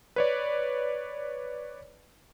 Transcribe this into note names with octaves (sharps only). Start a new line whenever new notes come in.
B4 C#5 D5